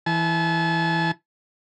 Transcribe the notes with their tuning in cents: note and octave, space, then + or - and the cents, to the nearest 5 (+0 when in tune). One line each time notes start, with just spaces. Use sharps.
E3 +0 A5 -40